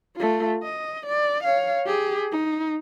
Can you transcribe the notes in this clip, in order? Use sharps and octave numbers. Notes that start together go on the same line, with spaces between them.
A3 F4
D#5
D5
C#5 F5
G4 G#4
D#4